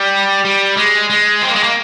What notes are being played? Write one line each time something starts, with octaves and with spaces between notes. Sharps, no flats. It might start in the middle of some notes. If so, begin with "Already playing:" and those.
Already playing: G3
G3
G#3
G#3
C4
A#3
G#3
A#3